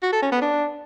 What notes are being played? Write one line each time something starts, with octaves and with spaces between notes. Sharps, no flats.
F#4
A4
C#4
B3
D4